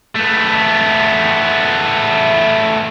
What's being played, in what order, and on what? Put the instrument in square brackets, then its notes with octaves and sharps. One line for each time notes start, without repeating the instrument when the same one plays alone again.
[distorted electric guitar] A3 B3